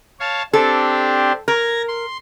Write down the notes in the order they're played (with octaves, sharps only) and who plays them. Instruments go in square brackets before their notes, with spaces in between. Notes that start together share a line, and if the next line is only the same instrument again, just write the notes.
[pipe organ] C#5 F5 A5
[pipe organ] C4 D4 G4 [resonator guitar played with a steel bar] A4
[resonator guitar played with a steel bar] A#4 [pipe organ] G#6 A#6
[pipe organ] C6